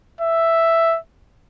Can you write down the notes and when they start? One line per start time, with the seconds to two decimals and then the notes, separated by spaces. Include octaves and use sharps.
0.21 E5